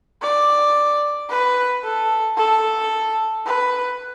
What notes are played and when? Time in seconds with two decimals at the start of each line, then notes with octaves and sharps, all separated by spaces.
0.22 D5
1.30 B4
1.84 A4
2.37 A4
3.46 B4